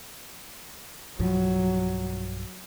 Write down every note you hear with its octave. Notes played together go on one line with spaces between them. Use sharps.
B1 G2 F3 F#3